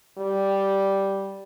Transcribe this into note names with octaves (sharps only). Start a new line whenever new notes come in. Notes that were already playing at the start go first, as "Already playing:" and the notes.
G3